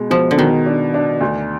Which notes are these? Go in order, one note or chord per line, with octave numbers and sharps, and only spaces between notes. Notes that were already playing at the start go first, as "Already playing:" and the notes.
Already playing: B2 G#3
B2 F3
D3
B2 D#3
D4
D4
D2